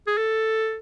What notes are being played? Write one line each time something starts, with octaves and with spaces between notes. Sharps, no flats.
G#4
A4